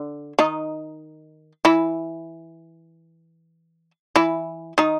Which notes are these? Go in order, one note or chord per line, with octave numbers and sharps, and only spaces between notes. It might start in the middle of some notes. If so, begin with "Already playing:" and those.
Already playing: D3
D#3 D#4
E3 E4
E3 E4
D#3 D#4